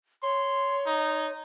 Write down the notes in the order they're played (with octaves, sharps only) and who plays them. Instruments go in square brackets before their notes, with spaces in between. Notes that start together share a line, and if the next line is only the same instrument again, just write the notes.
[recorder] C#5 [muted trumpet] C6
[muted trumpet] D#4